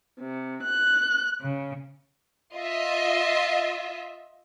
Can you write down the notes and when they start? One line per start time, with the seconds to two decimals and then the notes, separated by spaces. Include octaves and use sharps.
0.19 C3
0.61 F#6
1.40 C#3
2.56 F4 D#5 E5